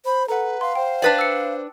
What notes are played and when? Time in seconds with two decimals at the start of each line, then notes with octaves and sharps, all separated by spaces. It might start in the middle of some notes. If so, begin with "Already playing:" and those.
0.05 C5 B5
0.28 A4 B4 F#5 A#5
0.61 F5 C6
0.75 C5 G5
1.02 D4 B4 D5 G5 A6 B6
1.19 E6 C#7